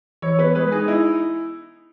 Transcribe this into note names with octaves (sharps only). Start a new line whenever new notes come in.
E3 C#5
B3 B4
G#3 B4
D#4 G#4
E4